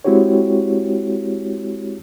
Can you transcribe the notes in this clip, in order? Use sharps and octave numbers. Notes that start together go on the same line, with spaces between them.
G#3 C4 E4 F#4 G4 C#5